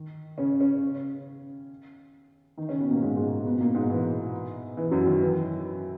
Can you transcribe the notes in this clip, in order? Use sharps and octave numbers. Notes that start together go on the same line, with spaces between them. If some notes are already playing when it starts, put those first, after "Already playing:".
Already playing: D#3
C#3 C#4
C#3 C#4
D#3 D#4
C#3 C#4
B2 B3
A#2 A#3
G#2 G#3
G#2 G#3
B2 B3
A#2 A#3
G#2 G#3
E3
E3
F#2 F#3
D#3
E3